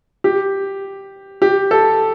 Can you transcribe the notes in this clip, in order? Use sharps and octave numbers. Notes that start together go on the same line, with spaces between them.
G4
G4
A4